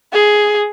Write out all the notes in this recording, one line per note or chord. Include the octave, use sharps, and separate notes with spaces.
G#4